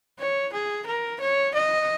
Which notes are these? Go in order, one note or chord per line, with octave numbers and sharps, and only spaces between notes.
C#5
G#4
A#4
C#5
D#5